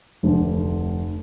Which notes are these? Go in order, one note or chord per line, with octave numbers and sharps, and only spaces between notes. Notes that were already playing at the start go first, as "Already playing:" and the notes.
F1 D2